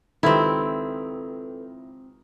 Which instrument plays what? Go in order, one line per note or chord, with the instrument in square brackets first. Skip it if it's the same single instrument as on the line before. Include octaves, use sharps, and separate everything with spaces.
[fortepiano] C#2 C3 D#3 [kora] C4 E4 [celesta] A4 B4